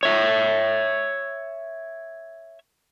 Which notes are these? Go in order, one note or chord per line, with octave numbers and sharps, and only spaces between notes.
C#5 E5